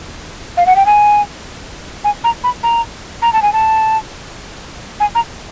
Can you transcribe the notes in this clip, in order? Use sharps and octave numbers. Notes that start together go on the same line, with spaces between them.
F5
F#5
G5
G#5
G#5
A#5
B5
A#5
A#5
A5
G#5
A5
G#5
A#5